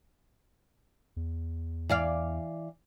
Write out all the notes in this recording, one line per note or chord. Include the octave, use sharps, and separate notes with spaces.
E2
E3 D5 F5